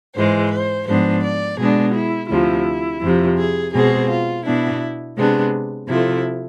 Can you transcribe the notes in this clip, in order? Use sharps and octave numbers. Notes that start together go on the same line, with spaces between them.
G#2 E3 G#3 C5
C5
G#2 F3 B3 D4 C5
D5
B2 G#3 B3 D4 G#4
E4
D2 C3 F3 E4
F2 C3 F3
G#4
B2 G#3 C4 G#4
F4
B2 B3 D4 E4
C3 G#3 B3 D4
C3 F3 A3 E4